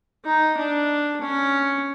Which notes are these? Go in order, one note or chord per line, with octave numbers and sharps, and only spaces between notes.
D#4
D4
C#4